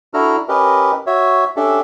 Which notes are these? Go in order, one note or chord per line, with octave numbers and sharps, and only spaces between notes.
D4 E4 F#4 A4 A#5 F6
C#4 G4 A#4 B4 D#5
F#4 C#5 E5
C#4 D4 G4 A4 E5